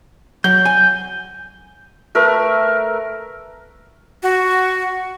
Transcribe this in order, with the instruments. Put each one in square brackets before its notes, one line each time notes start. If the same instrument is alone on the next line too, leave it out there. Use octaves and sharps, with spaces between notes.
[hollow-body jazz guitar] F#3 [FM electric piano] G6
[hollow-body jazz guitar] G#5
[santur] A3 A#4 B4 E5
[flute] F#4